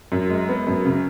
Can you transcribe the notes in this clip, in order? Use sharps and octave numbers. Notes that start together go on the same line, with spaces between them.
F#2
G#3
B3
F#2
C#3